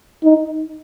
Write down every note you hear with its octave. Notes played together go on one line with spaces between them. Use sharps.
D#4